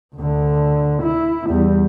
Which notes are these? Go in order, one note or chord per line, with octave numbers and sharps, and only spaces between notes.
D2 D3
E4
E2 G3